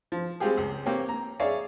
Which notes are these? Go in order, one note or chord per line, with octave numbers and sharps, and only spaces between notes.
F3
G3 G#3 C4 F4 G4 G#4
C#2
A#3 C4 G4 C#5
A#5
G#4 C#5 D5 E5 F5